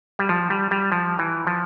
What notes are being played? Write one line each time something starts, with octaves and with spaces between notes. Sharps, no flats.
G3
F3
G3
G3
F3
E3
F3